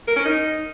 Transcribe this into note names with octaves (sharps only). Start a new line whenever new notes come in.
A#4
C#4
D#4